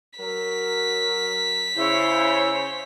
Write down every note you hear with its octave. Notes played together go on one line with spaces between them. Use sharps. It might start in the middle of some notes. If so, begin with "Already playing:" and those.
F#3 A#4 B6
C#3 E4 C5 C#5